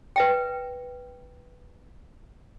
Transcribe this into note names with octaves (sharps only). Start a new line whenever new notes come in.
B4 E5 G5